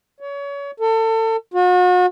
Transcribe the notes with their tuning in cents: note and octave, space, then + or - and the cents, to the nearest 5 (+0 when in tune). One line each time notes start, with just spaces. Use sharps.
C#5 +30
A4 +30
F#4 -40